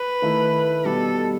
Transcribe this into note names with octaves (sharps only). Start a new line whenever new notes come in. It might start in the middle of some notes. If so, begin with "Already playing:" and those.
Already playing: B4
D#3 A3 E4
B2 G3 D#4 G4 A4